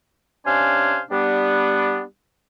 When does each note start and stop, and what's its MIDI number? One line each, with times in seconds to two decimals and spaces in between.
0.46 0.99 48
0.46 0.99 61
0.46 0.99 62
0.46 0.99 72
0.46 0.99 77
0.46 0.99 80
1.11 2.01 55
1.11 2.01 59
1.11 2.01 62